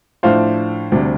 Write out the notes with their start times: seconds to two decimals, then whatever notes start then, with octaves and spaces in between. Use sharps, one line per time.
0.23 A2 F3 A3 D4 C5 F5
0.92 D2 C3 G3 D4